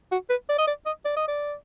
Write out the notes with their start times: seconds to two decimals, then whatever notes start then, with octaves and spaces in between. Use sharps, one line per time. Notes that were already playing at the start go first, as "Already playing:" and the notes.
0.12 F#4
0.30 B4
0.49 D5
0.58 D#5
0.67 D5
0.86 D#5
1.05 D5
1.17 D#5
1.28 D5